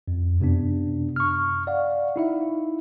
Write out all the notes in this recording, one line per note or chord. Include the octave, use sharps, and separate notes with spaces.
F2
F#2 C3 B3 D4
C#6 F6
D5 F5 F#5
D#4 E4 E5